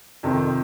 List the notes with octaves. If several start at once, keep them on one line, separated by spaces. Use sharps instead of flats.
F2 C3 D#3